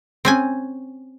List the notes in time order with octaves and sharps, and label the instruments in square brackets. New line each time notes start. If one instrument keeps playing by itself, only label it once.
[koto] C4 C#4 G#5